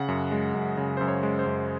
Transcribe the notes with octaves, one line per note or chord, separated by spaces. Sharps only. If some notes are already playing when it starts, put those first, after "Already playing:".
Already playing: C#3 F#5
F#2
G#3
F#2
C#3
F#2 C5
C#5
G#3
C5
F#2